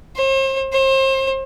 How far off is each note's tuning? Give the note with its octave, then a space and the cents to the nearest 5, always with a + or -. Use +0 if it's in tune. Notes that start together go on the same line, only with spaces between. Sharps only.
C5 +40
C5 +35